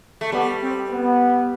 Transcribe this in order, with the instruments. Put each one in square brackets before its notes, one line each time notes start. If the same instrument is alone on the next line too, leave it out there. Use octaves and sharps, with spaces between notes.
[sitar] A3
[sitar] G3 [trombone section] B3
[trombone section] C4
B3